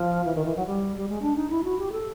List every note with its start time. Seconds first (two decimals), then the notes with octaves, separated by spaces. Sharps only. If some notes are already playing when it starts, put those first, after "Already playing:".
Already playing: F3
0.25 E3
0.35 D#3
0.45 E3
0.56 F#3
0.66 G3
0.97 G3
1.09 G#3
1.22 D4
1.36 D#4
1.50 E4
1.64 F#4
1.78 G4
1.92 A4